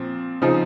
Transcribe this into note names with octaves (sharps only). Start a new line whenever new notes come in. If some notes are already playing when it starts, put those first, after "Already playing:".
Already playing: A#2 F3 C4
C#3 F3 C4 D#4